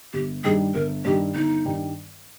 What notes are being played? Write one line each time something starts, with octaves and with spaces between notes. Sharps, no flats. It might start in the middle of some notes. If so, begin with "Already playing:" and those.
G1 G4
G2 D#3 G3 G#4
G1 A#4
G2 D#3 G3 G4
G1 D#4
G2 D#3 G3